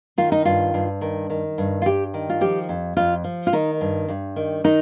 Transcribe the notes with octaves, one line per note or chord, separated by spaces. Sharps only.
D#3 F4
D#4
G2 F4
G2
D#3
D#3
G2
F4
G2 G4
D#3
F4
F3 G4
F2
F2 F4
F3
F4
D#3 D#4
G2
G2
D#3
D#3 D#4